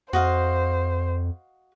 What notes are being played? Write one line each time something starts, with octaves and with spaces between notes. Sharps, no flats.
F2 F#4 C5 D#5 F5